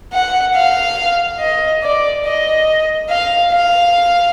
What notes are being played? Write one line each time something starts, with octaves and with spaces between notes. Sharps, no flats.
F#5
F5
D#5
D5
D#5
F5
F5